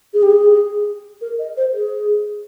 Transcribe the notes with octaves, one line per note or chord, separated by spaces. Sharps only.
G#4
G4
G#4
A#4
D#5
C5
G#4